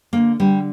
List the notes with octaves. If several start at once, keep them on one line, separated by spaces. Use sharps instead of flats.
D3 A#3
D3 G3